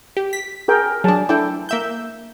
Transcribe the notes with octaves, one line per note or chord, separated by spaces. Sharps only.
G4
B6
G#4 A#4 G5
F#3 D4 G#4 A5
D4 E4 A4 G5
A#3 E5 G6